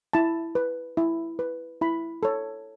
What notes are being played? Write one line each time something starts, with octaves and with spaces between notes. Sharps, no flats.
E4 A5
B4
E4
B4
E4 B5
A4 C#5